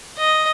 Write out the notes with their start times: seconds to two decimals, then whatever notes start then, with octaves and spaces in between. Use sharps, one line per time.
0.18 D#5